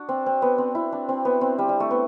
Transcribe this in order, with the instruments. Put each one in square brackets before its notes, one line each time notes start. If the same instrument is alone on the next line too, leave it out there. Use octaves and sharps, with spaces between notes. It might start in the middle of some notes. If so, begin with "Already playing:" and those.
Already playing: [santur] D4 F#4
C4
C4
B3
C4
E4
D4
C4
B3
C4
G3
G3
A3
B3